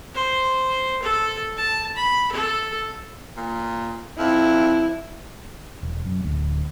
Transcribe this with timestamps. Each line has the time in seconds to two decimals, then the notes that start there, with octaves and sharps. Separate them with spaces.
0.15 C5
1.02 A4
1.57 A5
1.96 B5
2.32 A4
3.37 A#2
4.18 F2 E4
5.83 E1
6.05 F#2
6.24 D1 D2